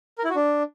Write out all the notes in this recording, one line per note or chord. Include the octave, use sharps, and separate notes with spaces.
A#4
E4
F#4
D4